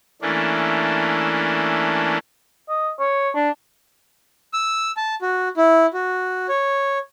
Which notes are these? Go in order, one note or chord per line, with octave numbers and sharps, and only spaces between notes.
E3 A3 A#3 C#4 D4
D#5
C#5
D4
E6
A5
F#4
E4
F#4
C#5